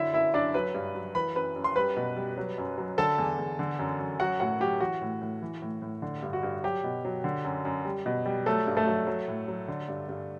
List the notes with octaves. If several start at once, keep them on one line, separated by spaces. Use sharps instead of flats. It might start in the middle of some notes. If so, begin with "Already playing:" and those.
Already playing: D3 F#3 E4 E5
F#2 E4 E5
F#2 D4 D5
F#3 B4 B5
G2
F#3
E3 B4 B5
F#2 B4 B5
F#2
C6
G3 B4 B5
B2
G3
F#3
F#2
F#3
D3 A4 A5
E2
E2
D3
F#2
F#2
F#3 F#4 F#5
A2 F#4 F#5
F#3 G4
E3 F#4
A2
A2
E3
A2
A2
D3
G2
F#4
G2
F#3 G4
B2
F#3
D3
F#2
F#2
G3
B2
G3
F#3 A3 A4
G2
A3 A4
F#3
F#3
A2
F#3
D3
G2
G2